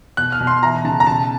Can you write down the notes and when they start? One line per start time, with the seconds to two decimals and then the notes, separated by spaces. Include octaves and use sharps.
0.17 B2 F#6
0.32 F6
0.40 B2
0.47 C6
0.62 E3 A#5
0.85 C#3 A5
1.00 A#5
1.07 B2 A5